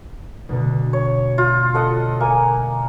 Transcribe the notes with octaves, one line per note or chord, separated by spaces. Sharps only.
D2 B2 D3
C#5
F4
A4 D#5 F#5
A#3 G#5